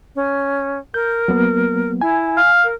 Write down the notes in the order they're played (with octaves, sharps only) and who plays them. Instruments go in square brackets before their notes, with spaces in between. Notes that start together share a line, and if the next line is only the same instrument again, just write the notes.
[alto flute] C#4
[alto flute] A#4 [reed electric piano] G6
[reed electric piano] F#3 A#3 B3
[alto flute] E4 [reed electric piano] G#5
[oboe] F5
[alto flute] A#4